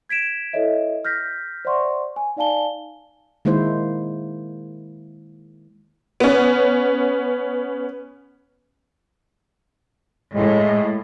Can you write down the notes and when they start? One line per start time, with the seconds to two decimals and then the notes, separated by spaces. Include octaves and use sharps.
0.09 G#6 B6 D7 E7
0.53 E4 A4 B4 C#5 D#5 E5
1.05 F6 G6 A#6 B6
1.65 C5 D5 E5 F#5 C6 C#6
2.16 G#5
2.37 D#4 D5 F5 G#5 A5 G7
3.45 D#3 G#3 A#3 E4 C5
6.20 B3 C#4
10.34 A2 G#3